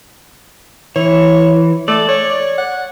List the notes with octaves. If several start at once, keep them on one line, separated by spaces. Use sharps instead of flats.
E3 C#5
A3 D5
C#5
F#5